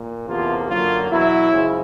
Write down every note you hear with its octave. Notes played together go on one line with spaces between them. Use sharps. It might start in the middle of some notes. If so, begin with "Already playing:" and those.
Already playing: A#2
E2 C3 F3 A#3 F4
F#2 D3 F#3 A#3 F4
E2 B2 F#3 E4
F#2 C#3 F3 G#3